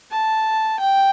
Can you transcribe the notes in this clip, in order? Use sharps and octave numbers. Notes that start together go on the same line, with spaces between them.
A5
G5